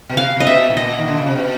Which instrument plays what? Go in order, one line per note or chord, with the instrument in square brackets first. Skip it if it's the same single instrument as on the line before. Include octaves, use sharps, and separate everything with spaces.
[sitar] B2
[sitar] C3 [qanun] F5
[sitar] C3 [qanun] D#5
[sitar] B2 [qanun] E5
[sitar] A2
[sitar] A#2 [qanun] D#5
[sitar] D#3
D3
C#3
C3
B2